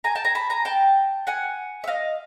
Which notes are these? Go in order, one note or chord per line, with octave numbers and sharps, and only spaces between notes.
G#5 A#5
G5 A5
G#5 A#5
A5 B5
G#5 A#5
G5 A5
F#5 G#5
E5
D#5 F5